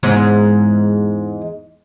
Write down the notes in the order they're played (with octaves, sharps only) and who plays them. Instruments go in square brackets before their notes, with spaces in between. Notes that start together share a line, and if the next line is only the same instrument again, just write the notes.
[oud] E2 G#2 G#3